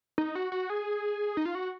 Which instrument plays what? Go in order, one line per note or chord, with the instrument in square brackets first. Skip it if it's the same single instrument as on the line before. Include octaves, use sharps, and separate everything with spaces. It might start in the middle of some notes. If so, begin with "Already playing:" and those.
[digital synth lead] D#4
F#4
F#4
G#4
D#4
F4
F#4